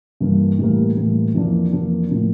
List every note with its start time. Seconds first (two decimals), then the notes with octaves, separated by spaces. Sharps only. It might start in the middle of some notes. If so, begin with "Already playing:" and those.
0.20 G2 E3 A#3
0.59 A2 E3 G3 A#3
0.97 A2 E3 G3 A#3
1.34 F2 E3 A#3 D4
1.73 F2 E3 A#3 D4
2.11 A2 F3 A#3